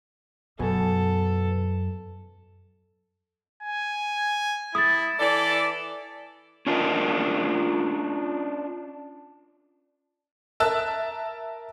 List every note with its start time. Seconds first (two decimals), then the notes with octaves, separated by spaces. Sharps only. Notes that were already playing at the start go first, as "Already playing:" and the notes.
0.59 F#2 B2 B3 A4 G#5
3.63 G#5
4.75 E4 D#6 A6
5.20 E3 A4 D5
6.66 C#4 D4 F4 G4 A#4 D#5
10.60 A#4 E5 A5 E6 F#6